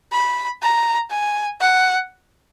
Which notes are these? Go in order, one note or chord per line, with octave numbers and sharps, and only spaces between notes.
B5
A#5
G#5
F#5